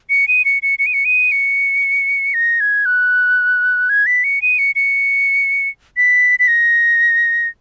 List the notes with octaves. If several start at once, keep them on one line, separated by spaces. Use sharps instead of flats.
C#7
D#7
C#7
C#7
C#7
D#7
C#7
D#7
C#7
A#6
G#6
F#6
G#6
B6
C#7
D#7
C#7
C#7
B6
B6
A#6